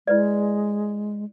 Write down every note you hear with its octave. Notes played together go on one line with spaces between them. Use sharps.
G#3 E4 B4 D5